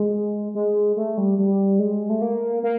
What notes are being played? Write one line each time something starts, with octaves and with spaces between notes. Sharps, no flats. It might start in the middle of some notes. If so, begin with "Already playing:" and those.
Already playing: G#3
G#3
A3
G3
G3
G#3
A3
A#3
A#3